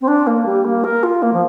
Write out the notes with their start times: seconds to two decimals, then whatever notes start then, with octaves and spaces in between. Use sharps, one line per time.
0.01 C4
0.07 D4
0.27 A#3
0.46 G3
0.64 A#3
0.84 A#4
1.03 F4
1.22 A#3
1.33 F3